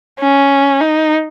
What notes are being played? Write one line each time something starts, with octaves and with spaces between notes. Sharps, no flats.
C#4
D#4